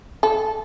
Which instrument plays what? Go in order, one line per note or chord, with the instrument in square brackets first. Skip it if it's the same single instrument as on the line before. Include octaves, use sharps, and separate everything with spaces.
[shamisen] A4